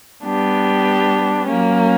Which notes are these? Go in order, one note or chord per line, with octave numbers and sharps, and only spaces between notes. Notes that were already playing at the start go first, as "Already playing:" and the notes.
G3 B3 D4 G4
F#3 A#3 C#4